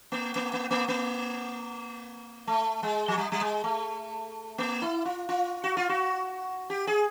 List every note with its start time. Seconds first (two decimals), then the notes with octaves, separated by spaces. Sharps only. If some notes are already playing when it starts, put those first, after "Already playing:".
0.12 A#3
0.36 A#3
0.53 A#3
0.71 A#3
0.88 A#3
2.47 A3
2.83 G#3
3.08 F#3
3.17 G3
3.32 G3
3.41 G#3
3.64 A3
4.58 A#3
4.82 E4
5.05 F4
5.29 F4
5.64 F#4
5.77 F4
5.89 F#4
6.70 G4
6.87 G#4